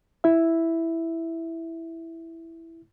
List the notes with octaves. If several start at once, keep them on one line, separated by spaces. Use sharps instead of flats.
E4 E5